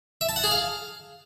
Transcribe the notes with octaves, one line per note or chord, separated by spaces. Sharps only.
E5
A5
F#5
G#4
F5